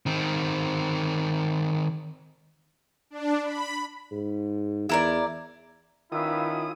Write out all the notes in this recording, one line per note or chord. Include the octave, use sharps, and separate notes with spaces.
D#3 C4
D4
B5
G#2
E2 E4 A#4 D5
D#3 C#4 E4 F4 B4 F5 D#6 E6